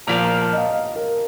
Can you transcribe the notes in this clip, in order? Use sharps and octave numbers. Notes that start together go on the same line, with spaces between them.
A#2 F3 A#3 A#5
A#5
A5
D#5
F5
F5
A#4